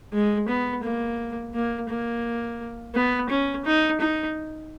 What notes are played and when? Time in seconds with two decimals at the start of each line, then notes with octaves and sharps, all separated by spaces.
0.13 G#3
0.49 B3
0.84 A#3
1.54 A#3
1.89 A#3
2.95 B3
3.30 C#4
3.65 D#4
4.00 D#4